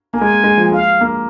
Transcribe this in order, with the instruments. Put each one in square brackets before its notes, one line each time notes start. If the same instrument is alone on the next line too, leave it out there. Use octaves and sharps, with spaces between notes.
[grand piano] A#3 [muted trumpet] G#5
[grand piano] G#3
A#3
G#3
F3
[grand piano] G#3 [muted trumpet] F5
[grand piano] A#3